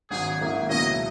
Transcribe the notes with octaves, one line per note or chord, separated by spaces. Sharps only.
G#1 G#2 F#3 G#4
G#2 D#3 A#3 C#4 E4
C#2 B2 F#3 C#4 E4 D#5